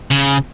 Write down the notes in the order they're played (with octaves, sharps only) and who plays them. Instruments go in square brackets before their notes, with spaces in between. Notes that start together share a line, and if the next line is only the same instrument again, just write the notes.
[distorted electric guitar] C#3